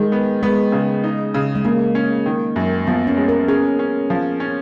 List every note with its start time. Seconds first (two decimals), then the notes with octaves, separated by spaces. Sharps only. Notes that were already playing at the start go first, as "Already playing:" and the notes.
Already playing: D#3 G#3
0.12 B3
0.43 G#3 B3
0.72 C#3
1.04 D#4
1.34 C#3
1.55 G#3
1.65 C#3 A#3
1.95 C#4
2.26 D#3
2.56 F#2
2.87 F3 B3
3.07 C#4
3.17 G#3
3.28 A#4
3.48 C#4 G#4
3.79 C#4
4.10 F3
4.40 C#4